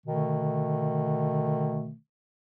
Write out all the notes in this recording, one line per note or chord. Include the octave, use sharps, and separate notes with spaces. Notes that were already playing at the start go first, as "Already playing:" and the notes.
B2 D3 D#3 A3